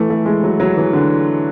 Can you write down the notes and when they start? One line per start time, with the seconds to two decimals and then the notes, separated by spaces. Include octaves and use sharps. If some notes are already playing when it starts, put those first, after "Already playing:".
Already playing: E3 A3
0.10 A3
0.26 G#3
0.44 F#3
0.60 F#3
0.77 E3
0.93 D3